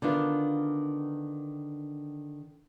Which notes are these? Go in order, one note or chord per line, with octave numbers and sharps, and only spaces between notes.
D3 D#3 B3 D4 F4